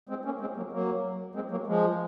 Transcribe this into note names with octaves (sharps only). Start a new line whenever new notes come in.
G#3 C4
A#3 C#4
G#3 C4
F#3 A#3
F#3 A#3
G#3 C4
F#3 A#3
F3 G#3